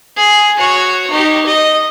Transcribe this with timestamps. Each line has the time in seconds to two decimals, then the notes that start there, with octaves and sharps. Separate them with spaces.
0.17 G#4
0.58 F#4 C#5
1.10 D#4 G4
1.46 D#5